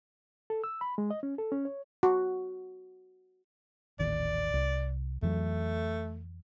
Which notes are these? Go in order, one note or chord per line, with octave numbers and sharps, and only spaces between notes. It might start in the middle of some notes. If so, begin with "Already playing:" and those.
A4
E6
B5
G#3
D#5
C#4
A4
C#4
C#5
F#4
D#1 A1 D#3 D5
C2
F2 E3 F#3 A3